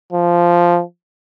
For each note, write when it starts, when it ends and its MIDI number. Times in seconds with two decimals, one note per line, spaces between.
0.13 0.82 53